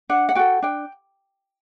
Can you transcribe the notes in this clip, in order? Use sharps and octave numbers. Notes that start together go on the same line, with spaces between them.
D4 F#5
F#5
F#4 A4 G5
D4 G5